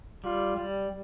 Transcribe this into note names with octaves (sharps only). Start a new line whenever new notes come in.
G3 F4
G3